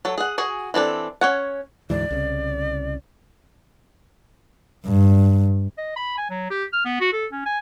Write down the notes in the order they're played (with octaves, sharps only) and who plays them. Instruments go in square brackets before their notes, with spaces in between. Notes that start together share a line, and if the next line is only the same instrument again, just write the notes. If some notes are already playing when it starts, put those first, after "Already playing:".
[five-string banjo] F#3 A4
G#4 F#5
F#4 G#4 G#5
E3 C4 D4 A4
C#4 C#5 F#5
[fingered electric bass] D2 G#2 E3 [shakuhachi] D5
[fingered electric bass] C2 C#3
[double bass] G2
[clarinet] D#5
B5
G#5
F#3
G4
F6
B3
F#4
A4
C#4
G#5